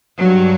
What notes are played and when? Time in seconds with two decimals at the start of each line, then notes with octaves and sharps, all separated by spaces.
0.19 G2 F#3